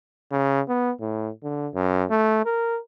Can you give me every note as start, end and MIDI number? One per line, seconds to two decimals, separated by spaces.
0.32 0.61 49
0.68 0.91 59
1.01 1.29 45
1.43 1.68 50
1.75 2.04 42
2.10 2.45 57
2.46 2.79 70